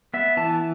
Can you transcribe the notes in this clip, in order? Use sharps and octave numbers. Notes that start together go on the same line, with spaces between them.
B3 E5
E3 A5